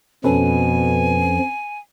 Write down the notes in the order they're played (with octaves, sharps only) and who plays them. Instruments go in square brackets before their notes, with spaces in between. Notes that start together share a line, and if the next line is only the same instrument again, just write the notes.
[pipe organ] F2 F3 [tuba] B2 [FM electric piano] C#4 A4 B4 [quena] G#5